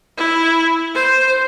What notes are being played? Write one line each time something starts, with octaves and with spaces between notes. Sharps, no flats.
E4
C5